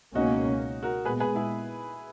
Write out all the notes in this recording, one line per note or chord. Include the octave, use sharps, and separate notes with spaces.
C#2 B2 A#3 C#4 D#4 F#4
F#4 A#4
A#2 G#3 B3 G#4 B4
G#4 B4
E4 G#4